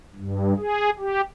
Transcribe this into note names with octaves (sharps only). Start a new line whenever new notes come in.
G2
G#4
G4